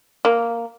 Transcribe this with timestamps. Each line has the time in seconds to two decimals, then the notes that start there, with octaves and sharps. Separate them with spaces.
0.25 A#3